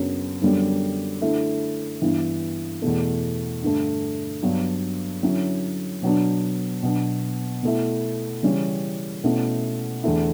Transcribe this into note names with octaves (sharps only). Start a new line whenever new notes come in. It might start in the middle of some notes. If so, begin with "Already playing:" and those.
Already playing: F#2 C#3 F#3 B3 D4
F#2 D3 G3 B3
D3 A3 E4
G2 E3 B3 E4
E2 B2 A3
G2 D3 A3
G2 F#3 B3 D4
D3 F#3 C#4 E4
B2 F#3 B3 D4
B2 F#3 B3 D4
B2 A3 E4
C#3 E3 G3 C#4
B2 A3 C#4 E4
E2 D3 A3 E4